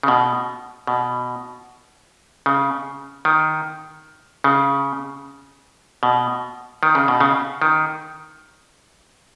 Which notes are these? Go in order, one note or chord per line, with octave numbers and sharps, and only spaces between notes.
C#3
B2
B2
C#3
D#3
C#3
B2
D#3
C#3
B2
C#3
D#3